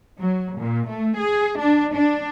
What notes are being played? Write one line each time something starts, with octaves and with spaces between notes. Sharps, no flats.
F#3
A#2
A3
G#4
D4
D4